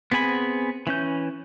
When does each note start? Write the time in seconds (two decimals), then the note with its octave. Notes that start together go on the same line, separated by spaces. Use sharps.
0.12 B3 C4 G#4 G#5 B5
0.87 E3 C#4 G6